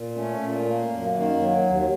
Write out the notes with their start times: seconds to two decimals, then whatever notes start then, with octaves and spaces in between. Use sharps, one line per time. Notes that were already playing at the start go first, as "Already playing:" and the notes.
Already playing: A#2
0.15 A3 C#4
0.39 A#2
0.66 A#3
0.90 F#2
1.15 D#3 A#3
1.40 F#3
1.65 D#2